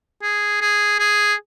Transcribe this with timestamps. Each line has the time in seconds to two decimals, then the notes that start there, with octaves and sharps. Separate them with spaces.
0.22 G#4
0.61 G#4
0.99 G#4